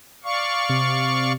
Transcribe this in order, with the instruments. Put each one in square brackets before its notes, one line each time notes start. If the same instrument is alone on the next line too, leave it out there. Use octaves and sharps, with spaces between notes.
[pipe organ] D5 F5 C#6
[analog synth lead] C3